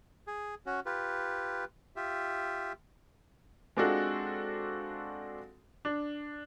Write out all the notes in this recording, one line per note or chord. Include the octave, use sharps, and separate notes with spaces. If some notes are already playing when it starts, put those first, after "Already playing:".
G#4
C#4 F#4
F4 G4 B4
F4 G4 E5
G#3 C4 D4 F4 F#4 A4
D4